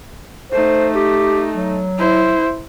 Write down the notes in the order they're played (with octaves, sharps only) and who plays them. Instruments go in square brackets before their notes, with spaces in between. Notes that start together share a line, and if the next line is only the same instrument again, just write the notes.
[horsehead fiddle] A3 D#4 [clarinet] C5
[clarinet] G4
F#3
[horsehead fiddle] E4 C5